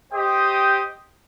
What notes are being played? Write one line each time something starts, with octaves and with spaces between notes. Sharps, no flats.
G4 C5 D#5 G5 D#6